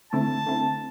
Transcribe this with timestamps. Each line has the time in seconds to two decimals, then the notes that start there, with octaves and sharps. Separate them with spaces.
0.12 D3 A3 C4 E4 A5
0.46 D3 A3 C4 E4